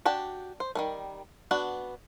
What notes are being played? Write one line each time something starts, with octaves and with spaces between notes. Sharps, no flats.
D4 F#4 G4 A5
C5
D#3 G3 A3
B3 D4 F#4 A5